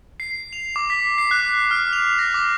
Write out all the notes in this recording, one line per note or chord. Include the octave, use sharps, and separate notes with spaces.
C7
F7
D6
B6
C7
F#6
F6
F7
A#6
D6